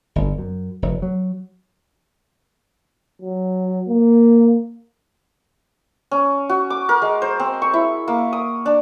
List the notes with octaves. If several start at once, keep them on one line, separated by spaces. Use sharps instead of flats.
G1
F#2
F1
F#3
F#3
A#3
C#4
F#4
D6
A#4
G#3
C5
C4
C#6
E4
A#3
D#6
D4